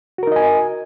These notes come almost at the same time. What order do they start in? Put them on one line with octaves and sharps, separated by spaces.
F#4 A#4 D#4 D#5 G#5